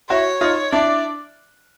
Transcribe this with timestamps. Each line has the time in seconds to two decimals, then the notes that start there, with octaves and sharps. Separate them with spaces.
0.09 E4 F#4 C#5
0.41 D#4 F4
0.72 D4 E4 D5